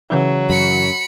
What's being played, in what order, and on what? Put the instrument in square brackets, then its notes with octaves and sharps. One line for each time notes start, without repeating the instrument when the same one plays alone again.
[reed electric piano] C#3 E3 E4 [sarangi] F#3
[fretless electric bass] F#2 [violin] B5 C#7